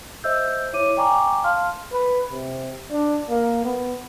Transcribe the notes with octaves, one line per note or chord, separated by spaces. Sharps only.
C5 D#5 E5 E6 G6
E4 C#5 E5 D6 D#7
D5 G5 G#5 A#5 C#6 D6
F5 A5 C6 F6
B4
C3
D4
A#3
B3